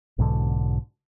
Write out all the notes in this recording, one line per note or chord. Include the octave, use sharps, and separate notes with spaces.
B1 G#2 B2 D3